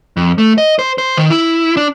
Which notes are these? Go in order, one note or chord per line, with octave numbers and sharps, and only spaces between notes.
F2
A3
D#5
C5
C5
D#3
E4
D4